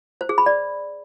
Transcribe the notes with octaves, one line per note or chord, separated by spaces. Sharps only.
C5
G#4
B5
D5